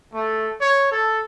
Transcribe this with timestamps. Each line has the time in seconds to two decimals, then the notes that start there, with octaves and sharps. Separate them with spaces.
0.13 A3
0.59 C#5
0.91 A4